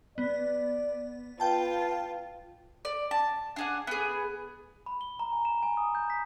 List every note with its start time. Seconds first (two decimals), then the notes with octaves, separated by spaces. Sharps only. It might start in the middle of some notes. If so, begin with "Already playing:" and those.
0.18 B3 D5
1.40 F4 B4 G5 A5
2.85 D5
3.11 A5
3.56 D4 G#4 F#5
3.87 B3 G#4
4.86 B5
5.01 G7
5.20 A#5
5.32 G#5
5.45 E7
5.63 G#5
5.77 D#6
5.95 G6
6.10 B6